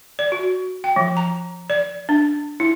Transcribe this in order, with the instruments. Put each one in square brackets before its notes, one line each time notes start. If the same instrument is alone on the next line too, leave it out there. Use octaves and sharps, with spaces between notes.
[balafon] D5
F#4
G5
F3
A#5
D5
D4
E4